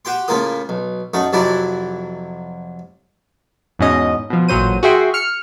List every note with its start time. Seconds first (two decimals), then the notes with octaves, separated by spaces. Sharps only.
0.05 F#4 G4 G5 C6
0.28 A2 C#3 A#3 F4 A#4 D#6
0.69 B1
1.14 F#2 A3 D#4 F#5
1.33 F2 C3 F#3 E4 D5 F#5
3.79 E2 G#2 B2 C#4 D#5
4.30 B2 F3
4.48 A1 A#2 F#3 C5 D#7
4.83 F#4 G#4 E5 G5 C6
5.14 F6 C#7